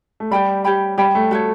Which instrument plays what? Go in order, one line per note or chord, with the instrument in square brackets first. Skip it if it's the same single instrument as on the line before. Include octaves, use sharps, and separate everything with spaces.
[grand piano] A3
[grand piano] G3 [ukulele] G4 D5 G5 B5
[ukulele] G4 C#5 G5 B5
[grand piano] G3 [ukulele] G4 C#5 G5 B5
[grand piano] A3
[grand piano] A3 [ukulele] F#4 A4 C#5